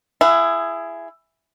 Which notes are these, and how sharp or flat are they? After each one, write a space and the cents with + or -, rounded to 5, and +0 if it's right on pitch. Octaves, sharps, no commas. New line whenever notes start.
E4 +20 G#4 +0 F#5 +0